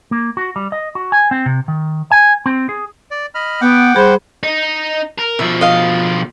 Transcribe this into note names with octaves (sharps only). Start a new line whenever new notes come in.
A#3
F#4
G3
D#5
F#4
G#5
C4
C3
D#3
G#5
C4
G#4
D5
D#5 B5 F6
B3 F#5 G5 D6
G3 G#4 C5 B5
D#4
A#4
B2 F3 E5
D#5 F5